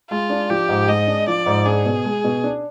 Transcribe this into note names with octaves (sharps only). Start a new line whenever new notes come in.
G#3 F4
D4
F3 G4
G#2
G#3 D#5
D4
F3 D5
G#2
D4 G#4
B2
G#3
B2
D4